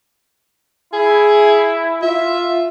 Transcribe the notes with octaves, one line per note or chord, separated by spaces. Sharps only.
E4 G#4
F4 E5